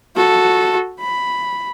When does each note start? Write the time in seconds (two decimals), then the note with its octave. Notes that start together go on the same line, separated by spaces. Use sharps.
0.16 F#4 A4
1.00 B5